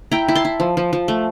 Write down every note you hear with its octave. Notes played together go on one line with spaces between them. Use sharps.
E4 G5 A#5
E4
A5 C6
E4
F3
F3
F3
A3